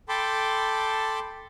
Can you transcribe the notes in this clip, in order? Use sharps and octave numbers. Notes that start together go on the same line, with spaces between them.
A4 G5 A5 B5 C6 D6